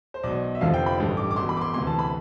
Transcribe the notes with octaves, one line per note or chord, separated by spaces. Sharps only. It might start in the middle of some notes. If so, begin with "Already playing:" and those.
C5
B1 B2 D5
E5
F1 F2 D3 F3 F5
G5
B5
A1 G2 D3
D6
D6
E1 E2 B2 C6
B5
D6
C6
D2 C3 E3 C6
A5
B5